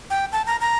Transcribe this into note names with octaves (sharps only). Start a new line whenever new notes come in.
G5
A5
A#5
A#5